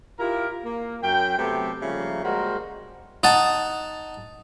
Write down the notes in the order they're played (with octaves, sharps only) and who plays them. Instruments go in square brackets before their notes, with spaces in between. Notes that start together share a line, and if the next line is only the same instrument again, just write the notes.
[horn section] E4 F4 G4 A#4
A#3
F#2 G5
C3 F#3 A3 B3 G4 A4
C#3 F3 G3 A3 A#3
G3 G#3 A#3 F#4 A#4 C5
[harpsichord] D#4 F#5 A5